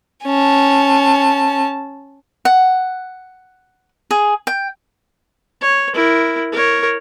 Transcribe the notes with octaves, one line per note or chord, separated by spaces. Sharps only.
C#4 A5
F#5
G#4
G5
C#5
E4 A#4
A#4 C#5